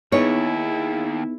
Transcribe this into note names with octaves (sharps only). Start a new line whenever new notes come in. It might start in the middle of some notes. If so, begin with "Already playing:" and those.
D#2 B3 D#4 E4 G#4 C#5